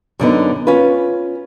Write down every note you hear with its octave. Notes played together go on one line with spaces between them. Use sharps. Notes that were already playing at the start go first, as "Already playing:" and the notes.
F#2 D3 B3 D#4
C#4 F4 B4